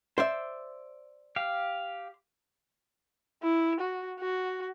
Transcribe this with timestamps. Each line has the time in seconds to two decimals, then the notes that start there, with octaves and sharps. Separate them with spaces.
0.18 C5 D5 E5
1.36 G4 F5
3.43 E4
3.80 F#4
4.20 F#4